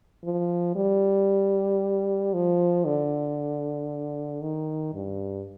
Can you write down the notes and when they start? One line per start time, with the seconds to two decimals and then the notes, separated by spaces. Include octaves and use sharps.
0.24 F3
0.76 G3
2.34 F3
2.86 D3
4.42 D#3
4.95 G2